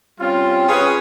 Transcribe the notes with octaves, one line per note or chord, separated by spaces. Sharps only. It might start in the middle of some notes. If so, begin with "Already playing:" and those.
G3 C4 C#4 F4
C#4 G#4 B4